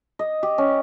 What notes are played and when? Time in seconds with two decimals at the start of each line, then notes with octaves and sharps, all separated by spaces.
0.19 D#5
0.43 G4
0.58 C#4